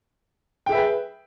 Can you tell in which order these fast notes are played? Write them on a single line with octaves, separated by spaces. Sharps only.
G5 G#4 E5 B4